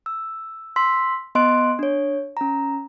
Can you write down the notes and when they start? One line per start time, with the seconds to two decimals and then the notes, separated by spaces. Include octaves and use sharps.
0.06 E6
0.76 C6 E6 B6
1.35 B3 D#5 C6 F#6 D7
1.79 D4 C#5
2.37 C#4 A#5